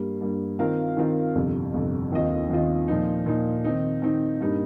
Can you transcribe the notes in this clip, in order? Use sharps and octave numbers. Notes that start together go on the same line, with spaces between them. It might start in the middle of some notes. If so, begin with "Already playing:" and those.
Already playing: G2 G3 A#3
G2 G3 A#3
D#3 C4 F4 A#4 F5
D#3 C4 F4 A#4 F5
G1 F2 C3
G1 F2 C3
D#2 D#3 C4 F4 D#5
D#2 D#3 C4 F4 D#5
A#2 F3 D#4
A#2 F3 D#4
D#3 C4 D#4
D#3 C4 D#4
G2 G3 A#3 D#4